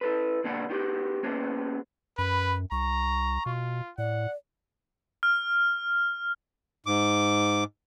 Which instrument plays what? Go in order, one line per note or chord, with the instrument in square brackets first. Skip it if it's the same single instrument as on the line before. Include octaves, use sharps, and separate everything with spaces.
[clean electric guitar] E4 A4 B4
B2 D3 A#3 D5 F#5 B5
B3 D#4 F#4 G4
A#3 B3 C#4 F#4 G#4 C5
[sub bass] F#2 [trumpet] B4 [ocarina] B5
[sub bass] C2 [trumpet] A#5 [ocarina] C#6
[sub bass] B2 [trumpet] F4
[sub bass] A2 [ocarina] D5 [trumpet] F#5
[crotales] F6
[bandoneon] G#2 D6